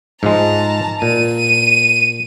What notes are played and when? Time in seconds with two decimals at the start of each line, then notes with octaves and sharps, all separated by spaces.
0.23 G#2 F3 G#3 A5 A#5
1.02 A#2 D#7